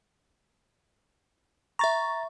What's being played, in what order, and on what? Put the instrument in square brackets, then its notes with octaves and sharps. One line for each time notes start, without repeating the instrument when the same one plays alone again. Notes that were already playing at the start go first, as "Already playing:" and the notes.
[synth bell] E5 C#6 [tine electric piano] A#5 A6